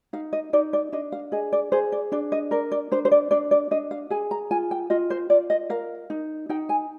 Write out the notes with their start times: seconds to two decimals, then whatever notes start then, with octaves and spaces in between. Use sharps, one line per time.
0.13 D#4 F5
0.33 D#5
0.53 D#4 D5
0.73 D5
0.92 D4 D#5
1.12 F5
1.32 G#4 D#5
1.53 D5
1.72 G#4 C5
1.92 D5
2.12 D4 D5
2.32 D#5
2.51 A#4 D5
2.72 D5
2.91 D4 C5
3.05 C5
3.11 D5
3.31 D4 D5
3.51 D5
3.71 D4 D#5
3.91 F5
4.10 G#4 G#5
4.31 A#5
4.51 F4 G#5
4.71 G5
4.90 F4 D#5
5.10 C5
5.30 F4 D5
5.50 D#5
5.70 A#4 F5
6.10 D#4
6.49 D#4 G5
6.69 G#5